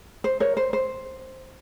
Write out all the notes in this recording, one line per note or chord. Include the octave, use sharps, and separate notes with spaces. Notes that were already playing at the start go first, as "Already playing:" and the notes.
C5
A#4 C#5
C5
C5